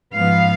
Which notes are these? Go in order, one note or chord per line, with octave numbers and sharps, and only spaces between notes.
G#2 F3 B3 F5